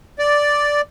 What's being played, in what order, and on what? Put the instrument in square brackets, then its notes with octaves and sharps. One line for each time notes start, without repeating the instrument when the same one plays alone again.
[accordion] D5